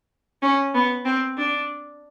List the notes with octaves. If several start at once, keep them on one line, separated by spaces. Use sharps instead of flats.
C#4
B3
C4
D4